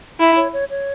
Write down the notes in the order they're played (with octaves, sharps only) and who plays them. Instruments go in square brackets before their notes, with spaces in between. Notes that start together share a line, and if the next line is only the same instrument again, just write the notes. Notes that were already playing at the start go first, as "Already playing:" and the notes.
[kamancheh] E4 [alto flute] E5
[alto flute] C#5
C#5
C#5